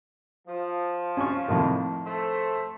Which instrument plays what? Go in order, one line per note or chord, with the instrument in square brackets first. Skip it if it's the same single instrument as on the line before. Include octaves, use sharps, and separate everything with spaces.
[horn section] F3
[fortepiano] C#4 C#6
F2 A2 D#3
[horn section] A3 C5